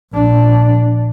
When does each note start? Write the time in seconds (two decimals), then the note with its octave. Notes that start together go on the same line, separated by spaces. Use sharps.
0.13 A#1 D4